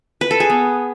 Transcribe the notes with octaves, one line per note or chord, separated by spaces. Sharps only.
B4
A4
G#4
B3